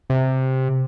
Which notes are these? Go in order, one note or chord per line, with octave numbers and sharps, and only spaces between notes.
C3